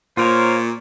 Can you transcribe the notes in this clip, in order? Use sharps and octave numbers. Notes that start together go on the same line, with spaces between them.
A#2 F4 A#4 C5 C#5